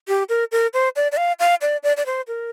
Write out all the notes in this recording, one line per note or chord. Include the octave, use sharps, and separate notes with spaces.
G4
A#4
A#4
C5
D5
D5
F5
F5
D5
D5
D5
C5
A#4